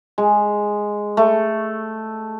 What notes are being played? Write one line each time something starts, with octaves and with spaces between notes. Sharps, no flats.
G#3
A3